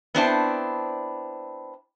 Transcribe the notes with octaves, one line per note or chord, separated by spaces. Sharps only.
B3 C4 D4 E4 C5 A5